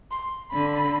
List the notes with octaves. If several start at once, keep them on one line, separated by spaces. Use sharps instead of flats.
C6
D3 B5